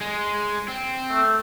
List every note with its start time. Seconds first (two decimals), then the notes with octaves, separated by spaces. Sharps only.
0.01 G#3
0.68 C4
1.11 A3